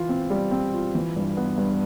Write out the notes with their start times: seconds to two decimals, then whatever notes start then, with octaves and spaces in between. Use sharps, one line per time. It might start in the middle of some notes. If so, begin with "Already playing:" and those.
Already playing: E3 F4
0.09 C4
0.30 G3
0.51 C4
0.73 F4
0.95 E3
1.16 G2
1.37 B3
1.58 G2